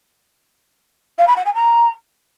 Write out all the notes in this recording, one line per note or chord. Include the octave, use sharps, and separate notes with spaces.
F5
B5
F#5
G#5
A#5